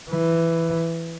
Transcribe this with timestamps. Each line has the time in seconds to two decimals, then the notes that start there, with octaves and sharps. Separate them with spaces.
0.10 E3